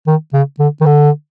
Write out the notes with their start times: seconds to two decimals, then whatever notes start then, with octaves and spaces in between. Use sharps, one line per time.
0.07 D#3
0.34 C#3
0.59 D3
0.81 D#3
0.86 D3